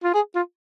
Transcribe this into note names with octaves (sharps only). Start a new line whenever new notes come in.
F4
G#4
F4